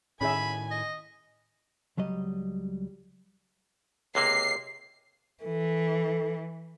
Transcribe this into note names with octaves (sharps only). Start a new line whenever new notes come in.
A2 D#3 C#4 G#4 E5 G#5 B5
D#5
C#2 F#3 G3 D#5
C#2 C3 A#3 C7
E3 A4